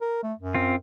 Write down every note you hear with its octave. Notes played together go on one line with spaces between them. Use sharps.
A#4
A3
F#2
C4 F4